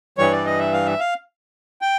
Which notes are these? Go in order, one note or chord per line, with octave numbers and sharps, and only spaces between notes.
G2 E3 G3 C#5
D5
D#5
E5
F5
E5
F5
G5